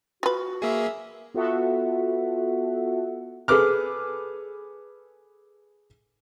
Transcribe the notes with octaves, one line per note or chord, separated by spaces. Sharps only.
F4 F#4 B4
A#3 G#4 E5
B3 F4 F#4 A4 E5 F#5
G#4 A4 B4 D6 F6